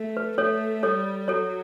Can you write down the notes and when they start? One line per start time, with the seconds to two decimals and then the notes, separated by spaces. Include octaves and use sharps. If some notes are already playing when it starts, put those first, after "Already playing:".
Already playing: A3
0.17 B4
0.38 A3 A4 C#5
0.83 G3 A4 C#5
1.28 F#3 A4 C#5